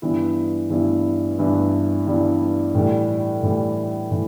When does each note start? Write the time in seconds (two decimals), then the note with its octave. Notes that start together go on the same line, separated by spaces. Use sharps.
0.02 G2 E3 G3 B3 E4
0.70 G2 E3 G3 B3 E4
1.38 G2 E3 G3 B3 E4
2.07 G2 E3 G3 B3 E4
2.75 A2 E3 G3
3.43 A2 E3 G3
4.11 A2 E3